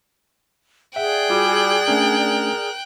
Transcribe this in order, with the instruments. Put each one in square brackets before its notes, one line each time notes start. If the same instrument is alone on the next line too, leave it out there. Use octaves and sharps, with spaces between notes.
[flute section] G#4 D5 [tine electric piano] E5 F#5 [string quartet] G5 F#6
[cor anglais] G3 [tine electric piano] F4 F#4 G#5
[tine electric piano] A3 C#4 D4 [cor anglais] A#4